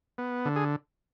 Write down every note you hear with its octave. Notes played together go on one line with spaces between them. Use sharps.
B3
D3
G#4